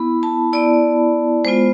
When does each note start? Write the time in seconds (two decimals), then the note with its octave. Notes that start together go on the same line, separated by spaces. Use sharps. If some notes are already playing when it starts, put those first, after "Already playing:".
Already playing: B3 E4 B5
0.23 A5
0.53 B3 E4 D5
1.45 G#3 B3 F4 C5